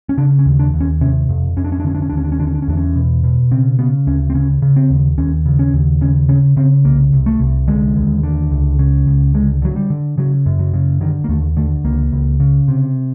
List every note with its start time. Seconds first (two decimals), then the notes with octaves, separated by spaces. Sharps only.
0.09 C#4
0.18 C#3 D4
0.39 C#4
0.46 D#2
0.59 D4
0.74 D#2
0.80 C#4
1.01 C3 C#4
1.29 F2
1.57 F2 C#4
1.64 D4
1.72 C#4
1.80 D4
1.85 D3 C#4
1.95 D4
2.02 C#4
2.10 D4
2.12 D#2
2.17 C#4
2.24 D4
2.32 C#4
2.40 D3 D4
2.47 C#4
2.54 D4
2.62 C#4
2.68 E2 D4
2.77 C#4
2.95 B2
3.24 B2
3.51 C#3 C4
3.79 C#3 B3
4.07 D2 C#4
4.30 C4
4.34 C#3 C#4
4.62 C#3
4.76 C4
4.90 D#2
5.18 D#2 C#4
5.46 C#3
5.59 C#4
5.73 D#2
6.01 C#3 C#4
6.29 C#3 C#4
6.57 C#3 C4
6.84 C2 A#3
7.13 C2
7.26 A3
7.40 C2
7.68 D3 G#3
7.96 D#2
8.23 D3
8.51 C#2
8.79 C#3
9.07 C#2
9.34 D3 G#3
9.62 D3 F#3
9.76 G3
9.90 D3
10.18 C#3 F#3
10.46 F#2
10.59 F#3
10.74 C#3
11.01 D3 D#3
11.24 A#3
11.29 D#2 A3
11.57 D3 A3
11.84 C#2 A#3
12.13 C#2
12.40 C#3
12.68 C3